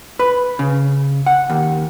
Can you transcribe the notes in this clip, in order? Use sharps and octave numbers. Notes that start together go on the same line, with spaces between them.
B4
C#3
F#5
D#2